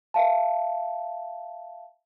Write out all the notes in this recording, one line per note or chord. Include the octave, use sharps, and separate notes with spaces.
E5 F5 A5